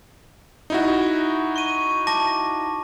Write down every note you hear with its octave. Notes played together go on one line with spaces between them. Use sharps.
D#4 E4 F#4
C#6 D#7
A5 D6 A#6